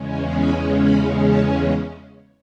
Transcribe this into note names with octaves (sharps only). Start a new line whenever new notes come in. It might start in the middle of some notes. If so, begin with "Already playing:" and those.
Already playing: E2 C#3 G#3 C#4
B5
B5
A5